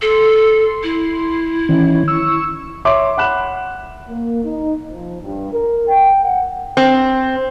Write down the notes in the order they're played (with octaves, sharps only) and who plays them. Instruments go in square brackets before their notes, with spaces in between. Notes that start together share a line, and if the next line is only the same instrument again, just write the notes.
[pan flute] A4 [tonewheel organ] C6
[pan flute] E4
[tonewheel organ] D#3 E3 C#4
C#6 E6
[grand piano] C#5 E5 C6 D6
F#5 B5 F#6 E7
[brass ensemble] A#3
D#4
F3
G2
A#4
G5
F#5
[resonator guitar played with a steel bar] C4